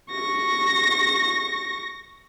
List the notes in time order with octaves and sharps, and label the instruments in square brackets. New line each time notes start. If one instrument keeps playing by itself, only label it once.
[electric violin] C#6 A#6